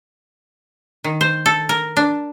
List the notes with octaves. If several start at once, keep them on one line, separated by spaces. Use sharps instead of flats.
D#3
C5
A4
A#4
D4